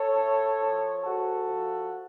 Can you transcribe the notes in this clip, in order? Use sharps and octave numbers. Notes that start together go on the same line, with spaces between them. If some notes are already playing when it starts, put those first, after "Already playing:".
Already playing: A4 C#5
A2
F3
G#2 F#4 A4
F3